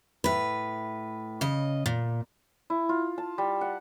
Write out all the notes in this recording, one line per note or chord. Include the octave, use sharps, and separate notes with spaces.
A2 B4
C#3 D#5
A#2
E4
F4
A5
G3
F#5